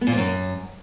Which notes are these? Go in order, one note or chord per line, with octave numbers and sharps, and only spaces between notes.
B3
A#2
F2
F#2